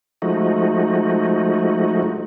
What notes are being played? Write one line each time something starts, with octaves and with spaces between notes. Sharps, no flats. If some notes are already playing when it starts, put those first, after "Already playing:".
F3 G#3 A3 D#4 F#4